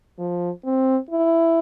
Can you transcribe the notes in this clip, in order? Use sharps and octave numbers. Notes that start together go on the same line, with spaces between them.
F3
C4
E4